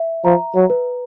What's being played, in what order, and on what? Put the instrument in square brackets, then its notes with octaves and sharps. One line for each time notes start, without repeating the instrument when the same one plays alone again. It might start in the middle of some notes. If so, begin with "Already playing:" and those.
Already playing: [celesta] E5
[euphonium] F3 [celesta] A#5
[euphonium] F#3
[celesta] B4